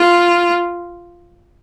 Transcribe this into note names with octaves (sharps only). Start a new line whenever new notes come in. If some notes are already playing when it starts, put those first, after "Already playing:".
Already playing: F4